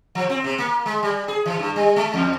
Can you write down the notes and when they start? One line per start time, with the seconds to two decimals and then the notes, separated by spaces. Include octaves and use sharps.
0.15 F3
0.30 C4
0.44 C3
0.58 A#3
0.86 G#3
1.03 G3
1.28 G#4
1.46 E3
1.59 G2
1.76 G3
1.96 G#3
2.13 E2